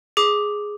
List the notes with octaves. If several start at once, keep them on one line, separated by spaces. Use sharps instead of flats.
G#4 D6